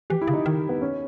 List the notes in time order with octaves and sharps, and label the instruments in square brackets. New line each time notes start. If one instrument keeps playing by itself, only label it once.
[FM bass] E3 [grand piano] G4
[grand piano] E4
[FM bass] C#3
[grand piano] D#4
[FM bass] D#3
[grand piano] B3
C#4